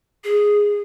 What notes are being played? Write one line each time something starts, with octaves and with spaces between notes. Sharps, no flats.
G#4